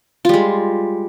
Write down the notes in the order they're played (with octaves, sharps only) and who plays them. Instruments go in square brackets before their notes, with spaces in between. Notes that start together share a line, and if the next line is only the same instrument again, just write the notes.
[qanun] F4
G3
G#3